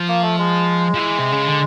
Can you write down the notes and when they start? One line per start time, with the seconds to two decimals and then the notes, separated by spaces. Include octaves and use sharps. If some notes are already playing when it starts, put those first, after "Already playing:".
Already playing: F3
0.08 A#3
0.23 A3
0.38 G#3
0.94 F3
0.99 E3
1.19 C3
1.32 C#3
1.46 D3